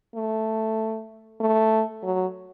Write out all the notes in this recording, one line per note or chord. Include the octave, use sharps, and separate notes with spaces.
A3
A3
F#3